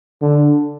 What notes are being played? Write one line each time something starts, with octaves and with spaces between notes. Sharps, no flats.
D3